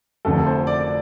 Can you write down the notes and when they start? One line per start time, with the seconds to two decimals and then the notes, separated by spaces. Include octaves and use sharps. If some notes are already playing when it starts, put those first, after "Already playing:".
0.25 F1 F2 D3 A3 A4
0.39 A4
0.47 C5
0.67 D5
0.80 D5